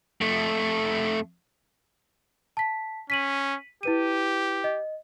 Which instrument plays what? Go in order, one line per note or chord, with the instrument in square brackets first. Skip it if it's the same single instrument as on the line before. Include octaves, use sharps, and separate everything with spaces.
[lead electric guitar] F2 A3
[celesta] A5 B6
[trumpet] C#4 [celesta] B6 D#7 F#7
[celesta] E4 B4 D#7 [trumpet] G4
[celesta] D#5